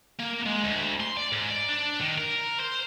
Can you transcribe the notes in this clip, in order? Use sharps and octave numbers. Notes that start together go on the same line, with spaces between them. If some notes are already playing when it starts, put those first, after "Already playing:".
A#3
G#3
D2
C6
D5
G#2
D5
D4
D#3
A#4
C5